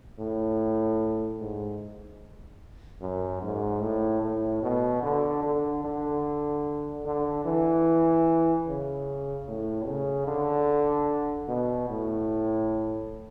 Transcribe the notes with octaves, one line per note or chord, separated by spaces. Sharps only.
A2
G#2
F#2
G#2
A2
A2
B2
D3
D3
D3
D3
E3
C#3
A2
C#3
D3
B2
A2